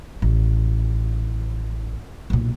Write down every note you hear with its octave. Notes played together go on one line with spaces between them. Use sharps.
A1
B1 A#2